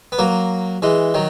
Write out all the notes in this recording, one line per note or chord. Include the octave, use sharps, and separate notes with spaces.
B3
F#3 A#3
E3 G#3
D#3 F#3